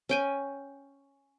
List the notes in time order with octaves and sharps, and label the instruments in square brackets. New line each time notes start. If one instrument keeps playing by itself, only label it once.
[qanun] C#4 G5 G#5